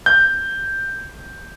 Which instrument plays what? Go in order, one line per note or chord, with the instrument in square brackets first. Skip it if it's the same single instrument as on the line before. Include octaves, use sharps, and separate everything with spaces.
[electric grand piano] G6